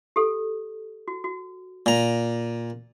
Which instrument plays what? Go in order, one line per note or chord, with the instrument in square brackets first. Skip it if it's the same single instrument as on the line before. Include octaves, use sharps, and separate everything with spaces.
[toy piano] G4 A4
F#4
F#4
[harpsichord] A#2 A#5